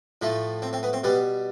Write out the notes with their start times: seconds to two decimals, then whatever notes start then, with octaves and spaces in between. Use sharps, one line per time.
0.22 A2 F3 A3
0.62 C4
0.73 C4
0.83 B3
0.93 C4
1.04 B2 G3 B3